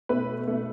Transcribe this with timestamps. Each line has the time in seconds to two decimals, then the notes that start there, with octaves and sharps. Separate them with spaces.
0.09 B2 A3 B4
0.48 B2 A3